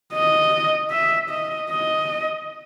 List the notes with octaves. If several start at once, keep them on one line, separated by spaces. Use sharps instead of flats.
D#5
E5
D#5
D#5